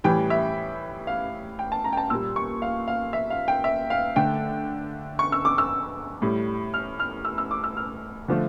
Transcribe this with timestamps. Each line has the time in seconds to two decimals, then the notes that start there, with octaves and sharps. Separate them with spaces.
0.04 A2 E3 G3 G5
0.30 E5
1.07 F5
1.59 G5
1.72 A5
1.84 A#5
1.93 G5
1.97 A5
2.10 A#2 G3 E6
2.36 C#6
2.62 F5
2.88 F5
3.13 E5
3.30 F5
3.48 G5
3.64 E5
3.90 F5
4.16 D3 A3 G5
5.19 C#6
5.32 E6
5.45 D6
5.58 E6
6.22 A2 G3
6.74 F6
7.00 F6
7.25 E6
7.38 E6
7.51 D6
7.64 E6
7.77 F6
8.28 D3 F3 A3